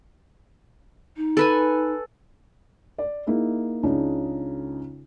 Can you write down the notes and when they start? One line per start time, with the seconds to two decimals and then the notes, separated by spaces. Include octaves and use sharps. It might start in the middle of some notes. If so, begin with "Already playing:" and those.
1.17 D#4
1.37 A4 B4 G#5
2.98 D5
3.27 A#3 D#4 E4 G#4
3.83 C#2 C#3 D4 D#4